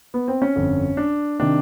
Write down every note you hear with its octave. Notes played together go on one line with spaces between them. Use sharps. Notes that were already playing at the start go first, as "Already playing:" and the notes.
B3
C4
C#4
G1 F2 D3
D4
C3 D#3 D4